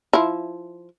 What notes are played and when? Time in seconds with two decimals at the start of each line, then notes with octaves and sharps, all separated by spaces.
0.13 F3 E4